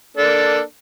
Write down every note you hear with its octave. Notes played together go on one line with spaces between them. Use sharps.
A#3 D4 A4